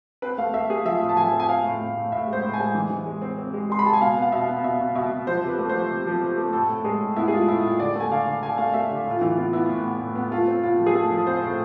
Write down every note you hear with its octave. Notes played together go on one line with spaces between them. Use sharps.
C4 B4
A3 F5
A3 E5
A3 G#4
F3 E5
A2
A5
F3 G#5
C4
G#5
C4 F5
A2
A2
A2
A2 E5
G#3
C5
A2
G#5
G#3
E3
E3
G#3
C4
C4
G#3
G#3 C6
B5
G#3 A5
G#5
B2 F5
B3
F5
B2 E5
B3
B2 E5
B2
B2 E5
B2
F3 C5
C3 B4
A3
C5
F3
C3
F3
C3
A3
A2 A4
A2
G#3 G#4
A2
B3 E4
G#4
G#3 F4
A2 E4
A2 F4
D3 D5
A3 G#5
D3 F5
D3
D3 G#5
A3 F5
A3 E5
D3
A2
F4
E3 E4
B3 F4
B3 E4
A2
B3
A2
B3
A3 F4
C4
A2 F4
F3
G#4
A3 A4
F3
C4 C5
A2